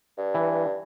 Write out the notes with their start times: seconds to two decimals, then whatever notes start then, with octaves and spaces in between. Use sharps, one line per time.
0.18 G2
0.35 E3